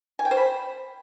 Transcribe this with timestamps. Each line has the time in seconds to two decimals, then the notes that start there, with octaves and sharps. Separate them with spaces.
0.19 G#5
0.25 G5
0.31 C5
0.37 B5